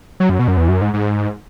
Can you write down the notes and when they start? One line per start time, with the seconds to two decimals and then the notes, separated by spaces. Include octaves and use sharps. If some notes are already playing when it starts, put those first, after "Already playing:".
0.20 F#3
0.30 F#2
0.39 B2
0.48 F#2
0.57 E2
0.69 F#2
0.81 G#2
0.94 G#2